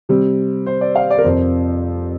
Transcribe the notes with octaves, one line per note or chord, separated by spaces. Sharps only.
C3 G3 C4
C5
D5
F5
D5
A#4
F2 C3 F3 C4 C5